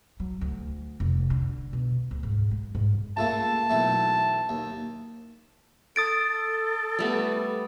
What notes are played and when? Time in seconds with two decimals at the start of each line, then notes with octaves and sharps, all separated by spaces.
0.20 F#3
0.41 D2
1.00 F1
1.30 D3
1.73 B2
2.11 D2
2.23 G#2
2.51 G#3
2.75 G#2
3.17 C#2 A3 A#3 A5
3.70 B1 E3 A3
4.49 D#2
5.96 A4 D#6 A6 D7
6.99 G3 A3 B3